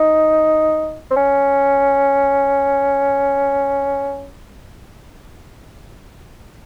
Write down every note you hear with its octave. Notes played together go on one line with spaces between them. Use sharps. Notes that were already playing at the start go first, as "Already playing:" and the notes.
Already playing: D#4
C4
C#4